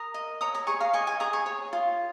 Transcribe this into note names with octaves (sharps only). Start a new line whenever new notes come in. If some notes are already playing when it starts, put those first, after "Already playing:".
Already playing: A#4 A#5 D#6
D#5
C#5 A#5 D#6
A#5 D#6
G#4 G#5 C#6
F5 A#5
D#5 G#5 C#6
G#5 C#6
G#4 A#5 D#6
G#5 C#6
C#5
F4